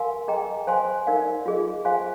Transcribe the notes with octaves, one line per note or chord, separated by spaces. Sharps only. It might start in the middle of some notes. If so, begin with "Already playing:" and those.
Already playing: G4 A#4 F5 G#5 C6
G#4 D#5 G5 A#5
C5 F5 G#5 C6
D#4 A#4 D5 F5
F4 G#4 D#5
C5 F5 G#5 C6